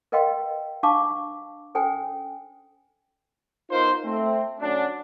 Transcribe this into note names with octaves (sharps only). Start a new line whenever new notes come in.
A#4 B4 D#5 F5 G5 C6
D4 F5 A5 C#6 D6
C#4 A4 C5 G5 G#5
B3 D#4 F4 A#4 C5
A3 C4
D3 F#3 C#4 D4